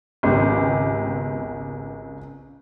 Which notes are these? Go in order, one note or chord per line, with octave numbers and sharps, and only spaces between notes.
G#1 C#2 C#3 B3 G4